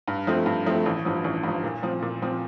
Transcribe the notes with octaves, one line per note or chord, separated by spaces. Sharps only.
G2
F3 A3 C4
G2
F3 A3 C4
A1
G2 F3
A1
G2 F3
A#2
F3 C4
A#2
F3 C4